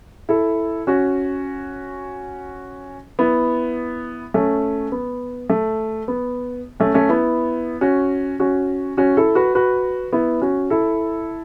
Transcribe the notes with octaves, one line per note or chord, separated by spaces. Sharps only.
E4 A4
C#4 F#4
B3 E4
A3 C#4
B3
A3
B3
A3 C#4
A3 C#4
B3 E4
C#4 F#4
C#4 F#4
C#4 F#4
E4 A4
F#4 B4
F#4 B4
B3 E4
C#4 F#4
E4 A4